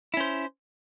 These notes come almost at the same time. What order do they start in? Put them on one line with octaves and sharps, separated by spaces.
E4 C#4 C5